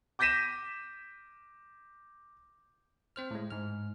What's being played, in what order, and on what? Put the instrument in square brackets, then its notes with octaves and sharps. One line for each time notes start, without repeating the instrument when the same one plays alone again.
[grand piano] D6 G6 A#6 B6 D#7 E7
[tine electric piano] C4 C5 F6
A2 G#3
G#2 F6